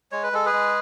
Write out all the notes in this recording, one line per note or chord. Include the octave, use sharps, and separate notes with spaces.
G#3 C#5
B4
G#3 A4
G#4 B4
G#3